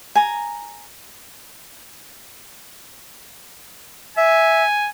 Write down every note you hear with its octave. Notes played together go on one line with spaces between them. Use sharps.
G#5 A#5
E5 G#5